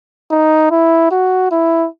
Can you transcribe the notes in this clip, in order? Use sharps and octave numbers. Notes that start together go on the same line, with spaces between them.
D#4
E4
F#4
E4